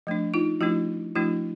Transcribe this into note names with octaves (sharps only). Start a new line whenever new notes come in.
F3 A3 D4
D#4 F4
F3 A3 D4 E4 F#4
F3 A3 D4 E4 F#4